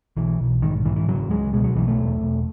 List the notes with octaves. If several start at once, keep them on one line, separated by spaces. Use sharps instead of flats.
B1 E3
B1
G#2 D#3
G#2 E3
E3
C#3 F#3
C#2 G#3
B2 G#3
F#3
B1 E3
A3
E1
E1